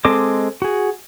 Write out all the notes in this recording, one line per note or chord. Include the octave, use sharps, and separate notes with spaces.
G#3 C4 A4 D#5 D6
F#4 G#4